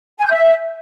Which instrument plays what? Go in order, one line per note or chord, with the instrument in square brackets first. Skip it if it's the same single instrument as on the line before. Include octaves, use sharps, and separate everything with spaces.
[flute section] G#5
G6
E5